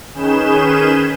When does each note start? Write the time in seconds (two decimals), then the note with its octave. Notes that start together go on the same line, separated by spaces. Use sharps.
0.15 D#3 C#4 G#4 B4 G6 E7